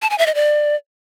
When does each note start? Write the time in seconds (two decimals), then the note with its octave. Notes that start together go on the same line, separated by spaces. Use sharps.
0.02 A5
0.10 G#5
0.18 E5
0.26 D#5
0.35 D5